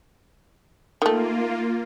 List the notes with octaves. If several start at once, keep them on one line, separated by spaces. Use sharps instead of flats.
D#3 A3 A#3 F4